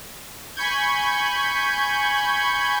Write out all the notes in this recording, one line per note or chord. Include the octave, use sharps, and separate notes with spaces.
G#5 B5 C#6 G6 G#6